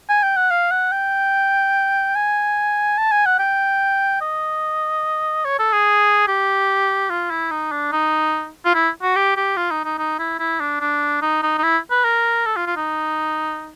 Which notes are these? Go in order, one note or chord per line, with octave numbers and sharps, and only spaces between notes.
G#5
G5
F#5
F5
F#5
G5
G#5
A5
G#5
F#5
G5
D#5
C#5
A4
G#4
G4
F4
E4
D#4
D4
D#4
F4
E4
F#4
G4
G4
F4
D#4
D#4
D#4
E4
E4
D4
D4
D#4
D#4
D#4
E4
B4
A#4
A4
F4
F4
D#4